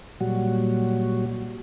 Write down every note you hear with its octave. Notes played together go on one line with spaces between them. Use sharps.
A#2 F#3 G3 F#4